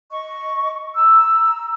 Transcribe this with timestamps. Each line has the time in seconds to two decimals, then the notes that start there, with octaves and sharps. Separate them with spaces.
0.11 D#5 C#6
0.96 A#5 E6